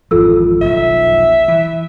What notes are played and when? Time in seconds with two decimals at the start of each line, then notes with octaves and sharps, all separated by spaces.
0.11 G#1 F2 E3 F4 A4 E6
0.62 F1 B1 D#3 E5
1.48 E3